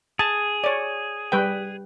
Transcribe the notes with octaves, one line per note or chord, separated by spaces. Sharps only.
G#4 A5
C#5 D5
G3 B4 G5